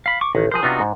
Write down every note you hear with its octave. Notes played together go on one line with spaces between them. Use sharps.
F5 B5
C#6 D6
A1 D#3
F3 G#4 A#4 C5
C3 B3 D4 D#4 F4 F#4
G#2